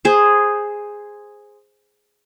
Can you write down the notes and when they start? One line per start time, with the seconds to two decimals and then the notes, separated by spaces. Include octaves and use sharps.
0.05 G#4 C5